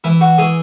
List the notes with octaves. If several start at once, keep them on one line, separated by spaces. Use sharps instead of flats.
E3 E4
F#4
E3 G#4